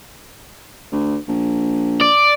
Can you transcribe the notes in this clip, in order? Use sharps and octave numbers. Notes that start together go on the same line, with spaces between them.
D2
A#1
D5